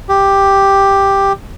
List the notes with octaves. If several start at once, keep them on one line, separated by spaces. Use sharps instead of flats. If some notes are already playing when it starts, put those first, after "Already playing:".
G4